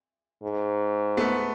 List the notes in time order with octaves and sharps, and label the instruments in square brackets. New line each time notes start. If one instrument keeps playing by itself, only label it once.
[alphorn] G#2
[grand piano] A3 B3